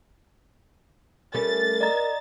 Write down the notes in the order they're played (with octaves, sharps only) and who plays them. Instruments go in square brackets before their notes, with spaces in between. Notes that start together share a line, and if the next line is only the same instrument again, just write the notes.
[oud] G3 A3 C#4 [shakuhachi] A#4 [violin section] A6
[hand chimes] D5 D#5 A#5